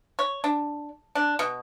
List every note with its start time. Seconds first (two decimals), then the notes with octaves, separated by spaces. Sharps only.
0.19 C#5
0.44 D4
1.15 D4
1.39 B2